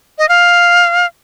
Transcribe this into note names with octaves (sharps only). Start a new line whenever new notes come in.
D#5
F5